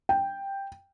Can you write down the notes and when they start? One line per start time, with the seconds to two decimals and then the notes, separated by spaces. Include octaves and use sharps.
0.09 G5